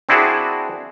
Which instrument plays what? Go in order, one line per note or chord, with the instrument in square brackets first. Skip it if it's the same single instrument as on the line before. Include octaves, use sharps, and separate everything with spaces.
[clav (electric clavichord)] C4 D4 E4 F#4 G#4